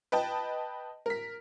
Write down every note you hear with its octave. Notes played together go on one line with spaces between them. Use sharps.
B4 D#5 G5 A5
A#4 B6